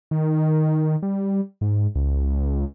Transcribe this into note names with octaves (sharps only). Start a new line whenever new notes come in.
D#3
G3
G#2
C#2